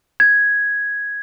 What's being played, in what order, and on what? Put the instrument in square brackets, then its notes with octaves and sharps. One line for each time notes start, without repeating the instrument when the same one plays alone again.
[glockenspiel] G#6